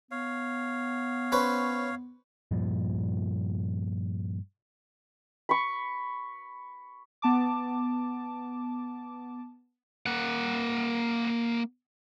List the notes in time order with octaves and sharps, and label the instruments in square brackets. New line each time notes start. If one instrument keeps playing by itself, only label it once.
[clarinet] B3 [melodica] C#5 F5
[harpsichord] C#4 B4 C5
[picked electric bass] G2 A#2 F3
[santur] B5 C#6
[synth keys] B3 A5 D6
[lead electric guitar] A#3 F#5